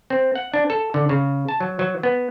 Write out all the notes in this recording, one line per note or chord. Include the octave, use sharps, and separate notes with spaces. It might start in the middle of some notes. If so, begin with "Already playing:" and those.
C4
F#5
D4
A4
D3
C#3
A5
F#3
F#3
B3